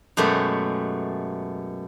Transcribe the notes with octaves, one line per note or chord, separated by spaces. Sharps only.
F#2 B2 G#3 A3 G4 A4